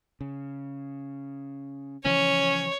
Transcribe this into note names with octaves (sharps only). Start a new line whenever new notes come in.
C#3
C#3 E3 F3 C#4 C#5